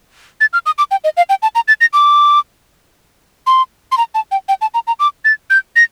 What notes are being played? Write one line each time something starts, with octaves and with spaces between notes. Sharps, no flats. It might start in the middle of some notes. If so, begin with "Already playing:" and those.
A6
F6
D#6
D6
G5
D#5
F5
G5
A5
A#5
A6
A#6
D6
C6
C6
A#5
A5
G5
G5
A5
A#5
A#5
D6
A6
G6
A#6